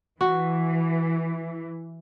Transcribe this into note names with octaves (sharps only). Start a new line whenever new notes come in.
E3 F#4